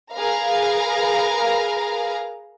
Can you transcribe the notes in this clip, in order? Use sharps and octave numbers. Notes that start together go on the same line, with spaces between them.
G#4 A#4 B4 F5 A#5